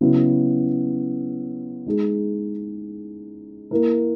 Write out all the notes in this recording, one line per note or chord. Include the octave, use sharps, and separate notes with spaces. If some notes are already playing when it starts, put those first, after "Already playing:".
C#3 F#3 B3 E4
G#3 D#4 G#4
A#3 E4 A#4